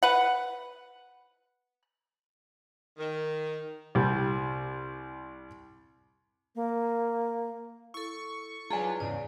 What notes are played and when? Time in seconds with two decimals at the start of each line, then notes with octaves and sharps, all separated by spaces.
0.03 B4 F#5
2.97 D#3
3.95 C2 G3
6.55 A#3
7.94 E4 A4 C#6
8.71 F#3 D4 E4 F4 G#4 B4 G#5
9.00 E2 G#2 C#3 D5